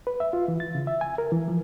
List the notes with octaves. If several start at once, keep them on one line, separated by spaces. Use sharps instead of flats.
B4
E5
F4
E3
A6
C#3
E5
G#5
A#4
E3
F3